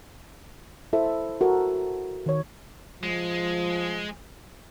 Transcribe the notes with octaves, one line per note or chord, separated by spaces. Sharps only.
E4 A4 C5 E5
F#4 A4 A#4
D#3 C#5
F3 G#3